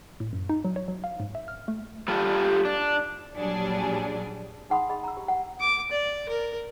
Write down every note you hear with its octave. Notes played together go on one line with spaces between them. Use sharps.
A2
F#2
D#4
F#3
C#5
F#3
F5
G#2
E5
F6
A3
G3 F4 A4
D4
A#1 F#3 G3 D4 G#4
D#4 G#4 F#5 B5 C6 D#6
G#4 D#5 B5
A#5 E6
G4
F#5
D6
D5
A#4